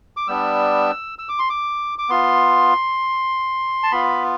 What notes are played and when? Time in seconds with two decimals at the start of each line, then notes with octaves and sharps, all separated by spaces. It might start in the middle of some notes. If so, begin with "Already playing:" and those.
0.17 D6
0.27 G3 B3 D4 E6
1.19 E6
1.29 D6
1.39 C6
1.50 D6
1.99 D6
2.09 B3 F4 C6
3.83 A5
3.92 B3 F4 B5